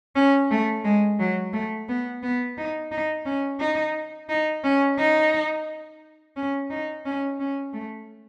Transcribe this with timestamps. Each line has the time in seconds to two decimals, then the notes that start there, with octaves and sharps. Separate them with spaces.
0.16 C#4
0.51 A3
0.84 G#3
1.20 F#3
1.53 A3
1.89 B3
2.23 B3
2.57 D#4
2.92 D#4
3.25 C#4
3.60 D#4
4.29 D#4
4.64 C#4
4.98 D#4
6.36 C#4
6.70 D#4
7.05 C#4
7.40 C#4
7.74 A3